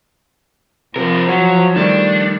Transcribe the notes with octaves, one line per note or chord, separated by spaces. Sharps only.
F2 C3 F3 A#4
F#3 C#5 G#6 B6
D#3 G3 A3 D4